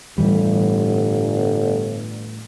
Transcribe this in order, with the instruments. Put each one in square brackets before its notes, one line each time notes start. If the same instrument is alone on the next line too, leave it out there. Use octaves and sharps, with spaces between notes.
[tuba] G1 [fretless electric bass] A2 E3 G3